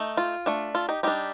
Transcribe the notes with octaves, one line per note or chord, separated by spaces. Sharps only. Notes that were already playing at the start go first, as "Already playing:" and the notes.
Already playing: A3 D#4
F4
A3 D4
F4 A4
D#4 G4
G3 D4 D#4 G4